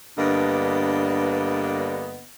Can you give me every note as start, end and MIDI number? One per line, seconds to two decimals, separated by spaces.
0.18 2.24 43
0.18 2.24 50
0.18 2.24 58
0.18 2.24 59
0.18 2.24 71
0.18 2.24 75